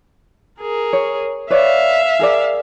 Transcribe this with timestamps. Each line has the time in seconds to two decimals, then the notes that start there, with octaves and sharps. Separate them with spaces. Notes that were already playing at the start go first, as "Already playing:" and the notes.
0.60 G#4 A#4
0.93 C#5
1.50 B4 C#5 D5 E5 F5
2.19 G#4 A#4 D5